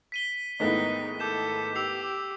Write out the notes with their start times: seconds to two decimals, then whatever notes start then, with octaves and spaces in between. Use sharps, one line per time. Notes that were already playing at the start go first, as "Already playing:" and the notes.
0.12 B6 D#7 G7
0.60 D#2 G#2 G#3 A3 B3 D#4 E4 B6
1.20 A4 D6 G6 E7
1.76 G4 E6 C7 F7